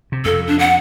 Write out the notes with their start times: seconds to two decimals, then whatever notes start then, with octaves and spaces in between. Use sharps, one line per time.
0.12 C3
0.25 F2 A4
0.47 D4
0.59 F#5